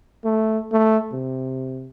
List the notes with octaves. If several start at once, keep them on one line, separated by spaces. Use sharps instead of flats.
A3
A3
C3